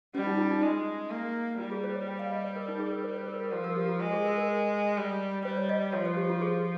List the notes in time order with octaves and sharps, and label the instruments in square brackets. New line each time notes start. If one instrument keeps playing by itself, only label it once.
[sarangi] G3 [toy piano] C#4
[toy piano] D#4
F4
D#4
[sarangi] G#3
A#3
[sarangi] G3 [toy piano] F4
[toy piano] G#4
C5
C#5
G5
F5
D#5
C5
A#4
D#4
G#4
A#4
C5
C5
A#4
A#4
[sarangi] F3 [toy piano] C5
[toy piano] A#4
G4
F4
[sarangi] G#3
[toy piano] G#4
A#4
A#4
[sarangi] G3
[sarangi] G3 [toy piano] C5
[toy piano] C#5
D#5
[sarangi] F3 [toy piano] C#5
[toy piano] C5
G4
F4
G#4